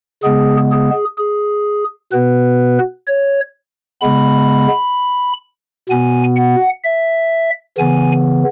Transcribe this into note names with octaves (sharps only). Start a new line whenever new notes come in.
C#3 G#3 B3 G#4
G#4
G#4
B2 B3 B4
C#5
C#3 G#3 B3 B5
B2 B3 G#5
F#5
E5
C#3 E3 B3 G#5